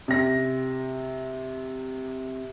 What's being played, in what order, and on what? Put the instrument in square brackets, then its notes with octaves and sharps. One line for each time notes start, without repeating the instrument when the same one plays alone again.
[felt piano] C3 A#6